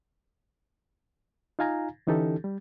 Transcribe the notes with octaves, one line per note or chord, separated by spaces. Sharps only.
D#4 F4 F5 G#5 A#5
D3 E3 C#4 D#4 G4 A4
G3